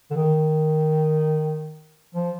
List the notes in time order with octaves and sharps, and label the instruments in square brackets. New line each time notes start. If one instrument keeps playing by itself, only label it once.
[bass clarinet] D3
D#3
F3